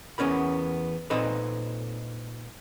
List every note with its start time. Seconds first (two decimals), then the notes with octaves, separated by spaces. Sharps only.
0.18 E2 B3 C#4 A#4 B5
1.10 A#2 C4 D#4 A4 B4